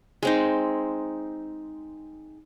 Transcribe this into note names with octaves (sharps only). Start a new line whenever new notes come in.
G#3 C4 D#4